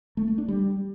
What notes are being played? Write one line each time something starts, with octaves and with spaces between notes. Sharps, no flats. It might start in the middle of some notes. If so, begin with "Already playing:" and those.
A3
A3
D4
G3